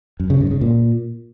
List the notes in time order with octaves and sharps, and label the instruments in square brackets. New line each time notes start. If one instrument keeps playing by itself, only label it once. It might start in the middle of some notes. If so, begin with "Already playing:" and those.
[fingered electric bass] F#2
C#3
G2
C#3
A#2